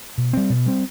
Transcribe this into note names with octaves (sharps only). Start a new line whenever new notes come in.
B2
G3 C4
B2
G3 C4